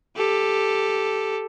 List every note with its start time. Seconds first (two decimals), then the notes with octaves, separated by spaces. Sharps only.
0.17 G4 A4